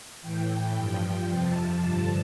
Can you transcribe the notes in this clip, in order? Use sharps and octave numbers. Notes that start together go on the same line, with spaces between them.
A2 E3 G5
G2 F3
F2 C3 F3 A5
G2 D3 F3